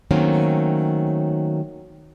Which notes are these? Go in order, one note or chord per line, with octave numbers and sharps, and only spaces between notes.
D#3 F#3 A3 A#3 C4 C#4